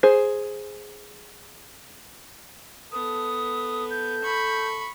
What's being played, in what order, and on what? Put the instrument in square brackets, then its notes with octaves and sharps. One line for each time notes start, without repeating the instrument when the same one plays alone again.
[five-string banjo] G#4 C5
[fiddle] B3 [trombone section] A4 [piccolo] D#6
[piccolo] G6
[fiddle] B5 C#6